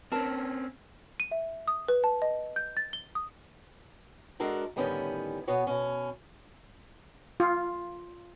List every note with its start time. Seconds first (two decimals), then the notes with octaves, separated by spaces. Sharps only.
0.12 C4 C#4 A#4 B4 A5
1.20 D#7
1.31 E5
1.67 D#6
1.89 B4
2.04 A5
2.22 D#5
2.56 G6
2.77 A6
2.93 G7
3.15 D#6
4.40 G#3 D4 F#4 A4 A#4 F#5
4.76 A2 D3 D#3 G3 B3 C#4
5.47 B2 B3 F#4 C#5 F#5
5.67 B2 C#4
7.40 F4